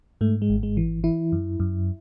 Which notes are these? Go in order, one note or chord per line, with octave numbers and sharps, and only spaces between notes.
G#2 A3
G#3
G#1
G#3
E3
E3 E4
F#2
F#2